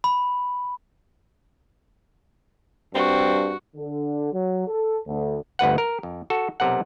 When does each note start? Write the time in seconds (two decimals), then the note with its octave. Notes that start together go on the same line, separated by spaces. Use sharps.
0.04 B5
2.95 G2 C4 F#4
3.76 D3
4.33 F#3
4.68 A4
5.07 D2
5.59 G1 D2 B4 F#5
5.78 A#4
6.03 F2
6.30 F#4 A4
6.60 B1 C3 A#4 F#5